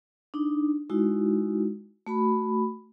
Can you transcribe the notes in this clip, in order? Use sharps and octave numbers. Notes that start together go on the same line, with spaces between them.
D4 D#4
G#3 D#4 E4 F#4
A3 F#4 B5